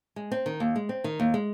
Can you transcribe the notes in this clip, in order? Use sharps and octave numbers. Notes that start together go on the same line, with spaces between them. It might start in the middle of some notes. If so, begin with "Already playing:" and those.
G#3
C4
D#3
D#2
G#3
C4
D#3
D#2
G#3